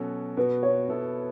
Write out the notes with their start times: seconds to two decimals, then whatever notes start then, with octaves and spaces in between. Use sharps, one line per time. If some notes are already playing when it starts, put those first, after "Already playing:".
Already playing: B2 F#3 C#4 F#4 A4
0.37 B2 B3 F#4 B4
0.63 C#5
0.88 B2 B3 E4 A4